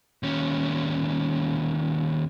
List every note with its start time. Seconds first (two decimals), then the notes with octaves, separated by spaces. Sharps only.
0.23 D#2 C#4